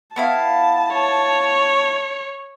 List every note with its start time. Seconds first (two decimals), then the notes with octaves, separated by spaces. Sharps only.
0.16 B3 E4 F5 A5
0.93 C#5